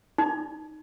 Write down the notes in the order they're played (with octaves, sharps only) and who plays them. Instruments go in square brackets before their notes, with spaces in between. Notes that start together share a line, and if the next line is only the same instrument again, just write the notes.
[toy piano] D#4